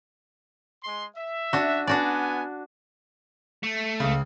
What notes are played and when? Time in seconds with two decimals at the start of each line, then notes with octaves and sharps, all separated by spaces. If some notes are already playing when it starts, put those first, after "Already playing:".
0.84 G#3 C6
1.16 E5
1.53 D4 F#4
1.87 B3 D4 F#4 D5 G#5
3.64 A3
4.00 C#2 C#3